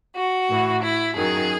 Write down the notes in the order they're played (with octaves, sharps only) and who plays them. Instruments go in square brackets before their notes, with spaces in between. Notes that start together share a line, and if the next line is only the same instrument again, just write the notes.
[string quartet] F#4
A2 E3
E4
F#2 D#3 F#3 G#4